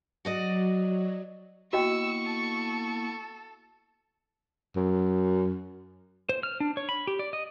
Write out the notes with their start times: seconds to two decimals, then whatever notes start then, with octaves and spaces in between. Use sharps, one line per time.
0.25 F#3 F#4 D5 D#5
1.73 A#3 B3 E4 F#4 D#5 G5 C#6 E6
2.25 A4
4.76 F#2
6.29 C5
6.43 F6
6.60 D4
6.77 C#5
6.89 B5
7.07 G4
7.19 D5
7.33 D#5